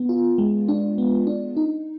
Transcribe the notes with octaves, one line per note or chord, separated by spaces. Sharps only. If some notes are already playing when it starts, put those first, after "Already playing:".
Already playing: B3
F4
G#3
D4
B3
D4
D#4